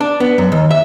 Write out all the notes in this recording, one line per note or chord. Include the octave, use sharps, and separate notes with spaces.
D4
B3
F#2
D#2
E5